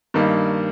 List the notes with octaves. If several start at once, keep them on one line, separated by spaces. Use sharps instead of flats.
G2 D#3 G3 A#3 D#4